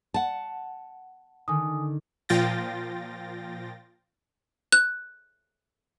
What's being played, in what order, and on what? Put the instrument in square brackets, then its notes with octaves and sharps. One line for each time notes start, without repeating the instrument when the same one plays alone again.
[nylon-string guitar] F#5 A5
[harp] D3 D#3 [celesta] G#5 D#6
[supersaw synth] A#2 F3 F4 G5 A6 A#6
[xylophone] F#6